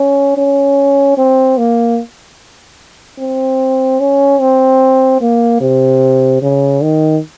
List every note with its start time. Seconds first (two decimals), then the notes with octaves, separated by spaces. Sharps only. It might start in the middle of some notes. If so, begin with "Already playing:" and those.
Already playing: C#4
0.38 C#4
1.18 C4
1.58 A#3
3.19 C4
4.00 C#4
4.41 C4
5.21 A#3
5.61 C3
6.42 C#3
6.83 D#3